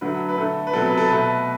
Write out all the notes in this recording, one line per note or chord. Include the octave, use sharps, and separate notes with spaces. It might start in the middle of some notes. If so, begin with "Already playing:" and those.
D3 F#3 A3 B4
B4
D3 A3 A4
B4
C3 F#3 B3 A4
B4
A4
B2 A3 B4